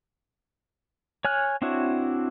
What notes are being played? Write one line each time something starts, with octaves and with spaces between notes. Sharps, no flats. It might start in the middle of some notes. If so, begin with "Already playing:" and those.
C#5 G#5 F6 F#6
C4 D4 E4 F#4 C#5